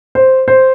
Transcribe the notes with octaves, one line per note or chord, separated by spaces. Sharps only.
C5
C5